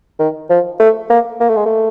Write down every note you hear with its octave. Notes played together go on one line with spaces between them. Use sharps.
D#3
F3
A3
A#3
A#3
A3
G#3
A3